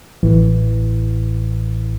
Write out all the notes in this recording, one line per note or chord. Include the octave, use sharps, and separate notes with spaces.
A1 A2 E3